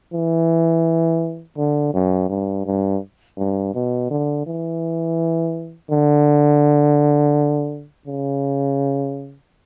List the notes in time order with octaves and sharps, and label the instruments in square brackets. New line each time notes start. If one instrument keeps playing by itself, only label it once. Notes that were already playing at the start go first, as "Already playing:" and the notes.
[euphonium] E3
D3
F#2
G2
G2
G2
B2
D3
E3
D3
C#3